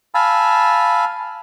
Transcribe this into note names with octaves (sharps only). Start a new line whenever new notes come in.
F5 G#5 A5 B5 E6